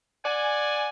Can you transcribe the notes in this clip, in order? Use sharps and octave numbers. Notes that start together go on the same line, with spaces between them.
D5 F#5 G#5